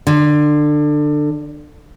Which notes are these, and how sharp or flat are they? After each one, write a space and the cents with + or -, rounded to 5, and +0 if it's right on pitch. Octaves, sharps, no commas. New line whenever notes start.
D3 +20